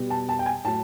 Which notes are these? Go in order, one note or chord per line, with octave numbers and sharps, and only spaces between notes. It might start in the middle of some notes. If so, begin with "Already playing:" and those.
Already playing: B2 G3 B3
A5
A5
G5
G#5
A2 F#3 A5